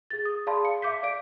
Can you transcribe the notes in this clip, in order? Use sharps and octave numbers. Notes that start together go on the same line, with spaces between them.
G#4 A6
D#6
G#4 D5 F5 A5 B5 C6
C#7
E5 F5 D6 G6 B6
D5 F5 D7